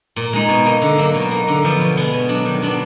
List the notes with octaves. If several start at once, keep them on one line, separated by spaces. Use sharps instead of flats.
A#2
G#3 D#4
B2
A#3 D#4
D3
F#3 A#3 D#4
B2
A#3 D#4
D3
F3 B3
B2
G#3 B3
B2
F#3 D4
D#3
F#3 B3 D4